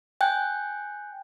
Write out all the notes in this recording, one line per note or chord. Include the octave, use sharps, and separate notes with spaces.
G5 G#5 F#6 G6